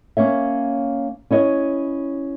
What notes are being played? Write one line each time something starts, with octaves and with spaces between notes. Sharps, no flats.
A#3 C#4 C#5 E5
C#4 E4 C#5 D#5